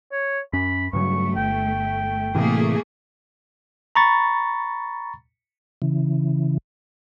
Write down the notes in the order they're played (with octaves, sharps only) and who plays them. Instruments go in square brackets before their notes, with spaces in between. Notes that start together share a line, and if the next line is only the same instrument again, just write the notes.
[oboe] C#5
[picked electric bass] F#2 C#4 [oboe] B5
[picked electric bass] G2 C#3 F#3 [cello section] A3 [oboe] C#6
[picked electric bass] G1 [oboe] G5
[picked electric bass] A2 C3 E3 [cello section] A3 A#3 G#4
[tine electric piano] A#5 B5 C#6 A6
[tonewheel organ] C#3 E3